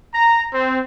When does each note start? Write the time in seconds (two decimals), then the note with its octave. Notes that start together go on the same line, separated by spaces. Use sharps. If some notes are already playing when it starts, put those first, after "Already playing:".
0.14 A#5
0.54 C4